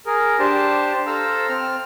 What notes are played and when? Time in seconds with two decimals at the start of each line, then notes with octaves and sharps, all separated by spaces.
0.06 G#4 A#4
0.39 D4 G4 C5 A5
1.07 A4 C5 F5 A#5 E6
1.49 C4 F6